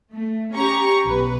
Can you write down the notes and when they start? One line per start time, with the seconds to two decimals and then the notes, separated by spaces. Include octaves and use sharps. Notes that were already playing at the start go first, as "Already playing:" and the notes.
0.13 A3
0.55 C#4 G4 A#5 C#6
1.03 B1 B4